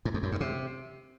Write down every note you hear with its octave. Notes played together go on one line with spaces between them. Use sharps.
G#2
F2
F#2
G2
C3